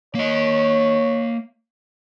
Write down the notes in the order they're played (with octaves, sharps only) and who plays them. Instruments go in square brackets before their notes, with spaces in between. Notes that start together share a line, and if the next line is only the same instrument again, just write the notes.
[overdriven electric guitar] A#3 D#5 [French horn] C#5